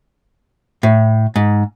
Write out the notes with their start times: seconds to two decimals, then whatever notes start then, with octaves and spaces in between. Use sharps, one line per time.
0.83 A2
1.36 G#2